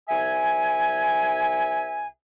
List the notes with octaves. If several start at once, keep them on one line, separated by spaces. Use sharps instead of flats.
C2 E5 G#5